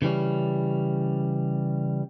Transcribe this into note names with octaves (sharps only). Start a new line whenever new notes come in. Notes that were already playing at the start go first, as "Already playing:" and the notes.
C#3 E3 G3 C#4